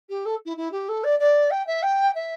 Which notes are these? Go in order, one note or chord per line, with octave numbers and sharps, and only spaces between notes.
G4
A4
E4
E4
G4
A4
D5
D5
G5
E5
G5
E5